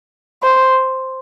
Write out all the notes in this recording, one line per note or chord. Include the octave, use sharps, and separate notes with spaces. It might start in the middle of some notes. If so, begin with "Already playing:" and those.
C5